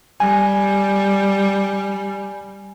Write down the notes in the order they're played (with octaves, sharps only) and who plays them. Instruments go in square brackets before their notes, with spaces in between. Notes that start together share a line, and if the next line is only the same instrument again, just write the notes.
[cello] G3 [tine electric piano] G#5